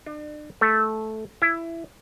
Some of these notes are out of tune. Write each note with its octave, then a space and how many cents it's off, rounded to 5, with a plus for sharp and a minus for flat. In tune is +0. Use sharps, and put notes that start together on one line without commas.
D4 +40
A3 -10
E4 +15